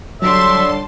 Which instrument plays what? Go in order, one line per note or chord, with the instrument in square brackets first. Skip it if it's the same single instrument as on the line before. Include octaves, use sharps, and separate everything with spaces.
[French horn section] D3 D4 C#5 [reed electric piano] F#3 [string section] G3 A5 C6 [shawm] E5